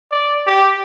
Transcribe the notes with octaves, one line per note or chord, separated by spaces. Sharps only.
D5
G4